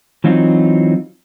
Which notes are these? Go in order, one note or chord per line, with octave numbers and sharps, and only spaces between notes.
E3 F#3 C4 D#4 F4